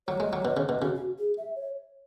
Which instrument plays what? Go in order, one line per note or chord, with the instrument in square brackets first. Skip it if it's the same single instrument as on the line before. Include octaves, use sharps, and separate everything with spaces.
[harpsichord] F#3 [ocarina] C#5
[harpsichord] G#3
F#3
B2
C#3
B2
[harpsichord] C#3 [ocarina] F#4
[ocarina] F#4
G#4
E5
C#5